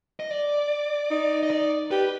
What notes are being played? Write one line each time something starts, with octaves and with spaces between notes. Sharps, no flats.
D#5
D5
D#4
D#5
D5
G4 B4